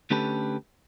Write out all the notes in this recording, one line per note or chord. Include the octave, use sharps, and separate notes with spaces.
D3 A3 C#4 G4 A4 B4